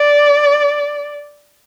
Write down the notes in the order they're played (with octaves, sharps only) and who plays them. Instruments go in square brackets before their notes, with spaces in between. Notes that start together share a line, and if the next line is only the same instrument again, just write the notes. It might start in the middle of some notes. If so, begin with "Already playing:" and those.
Already playing: [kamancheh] D5